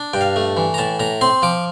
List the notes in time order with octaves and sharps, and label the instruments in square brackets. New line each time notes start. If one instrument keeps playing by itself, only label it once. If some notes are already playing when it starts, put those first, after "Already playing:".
Already playing: [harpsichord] D4
G2 G5
F5
A3
E3
A#5
A2 A5
A2 A#5
C4 C6
F3 D6